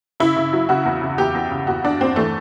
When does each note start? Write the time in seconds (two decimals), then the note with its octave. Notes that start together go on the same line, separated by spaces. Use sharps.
0.20 C#3 E4
0.36 C#3
0.53 F#3
0.69 C#3 F#4
0.85 E2
1.01 C#3
1.18 E2 G4
1.34 E2
1.51 C#3
1.67 E2 F#4
1.84 E2 D4
2.00 E2 C4
2.16 E3 A3